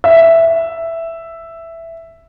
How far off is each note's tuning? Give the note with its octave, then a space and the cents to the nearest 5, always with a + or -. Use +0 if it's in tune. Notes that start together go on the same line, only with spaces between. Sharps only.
E5 +5